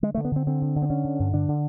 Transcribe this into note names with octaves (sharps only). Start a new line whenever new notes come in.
D3 G#3
D3 A3
B3
D3 C4
D3 C4
D3
D3
C4
D3 C#4
D3
G2
D3 D4
D3